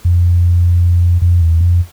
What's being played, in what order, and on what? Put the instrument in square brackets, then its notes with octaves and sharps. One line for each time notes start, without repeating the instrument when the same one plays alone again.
[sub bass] F2
F2
E2
F2